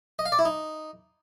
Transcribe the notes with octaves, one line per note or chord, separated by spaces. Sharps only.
D#5
F5
D5
E4
D#4